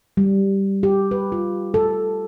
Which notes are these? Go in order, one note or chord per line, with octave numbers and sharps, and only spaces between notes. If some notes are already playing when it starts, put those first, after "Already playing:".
G3
G4
B4
F4
A4